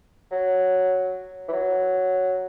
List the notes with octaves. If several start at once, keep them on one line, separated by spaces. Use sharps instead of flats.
F#3
E3
F#3